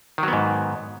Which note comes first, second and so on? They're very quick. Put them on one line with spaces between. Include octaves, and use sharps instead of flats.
D#3 F#3 B3 G#2